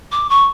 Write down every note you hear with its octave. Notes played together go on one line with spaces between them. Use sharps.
D6
C#6